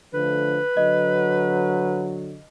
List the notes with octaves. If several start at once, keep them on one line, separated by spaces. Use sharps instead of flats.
D3 F3 A3 B4
D3 F#3 D#5